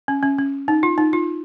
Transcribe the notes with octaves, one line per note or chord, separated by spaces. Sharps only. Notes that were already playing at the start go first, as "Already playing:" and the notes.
C#4
C#4
C#4
D#4
F4
D#4
F4